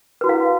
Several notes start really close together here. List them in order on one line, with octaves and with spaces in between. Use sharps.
B4 F#4 E4 F5